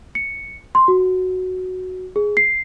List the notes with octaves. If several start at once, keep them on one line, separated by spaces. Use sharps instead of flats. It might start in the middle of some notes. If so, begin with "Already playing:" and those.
C#7
C6
F#4
G#4
C7